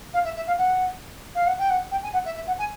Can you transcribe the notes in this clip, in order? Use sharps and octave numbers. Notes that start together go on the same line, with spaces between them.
F5
E5
E5
F5
F#5
F5
F#5
G5
F#5
G5
G#5
F#5
E5
E5
F#5
G#5